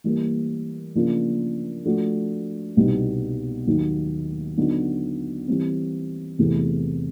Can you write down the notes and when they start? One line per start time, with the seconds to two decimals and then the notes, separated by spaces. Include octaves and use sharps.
0.04 E3 G3 A#3
0.95 C#3 F3 A#3 D4 F4
1.85 F3 A3 D4 F#4
2.77 C2 B2 G3 B3 D#4
3.67 D#2 D#3 F#3
4.57 D3 F#3 B3 D#4 F#4
5.48 E3 G3 C4
6.39 E2 C3 E3 A3 C4